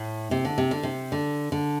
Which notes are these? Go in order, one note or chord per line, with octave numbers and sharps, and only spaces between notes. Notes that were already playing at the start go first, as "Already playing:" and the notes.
Already playing: A2
C3
D3
C3
D3
C3
D3
D3